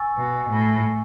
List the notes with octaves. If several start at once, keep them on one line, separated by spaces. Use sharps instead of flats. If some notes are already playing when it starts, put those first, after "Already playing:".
Already playing: G#5 C#6 E6 A6
B2
A2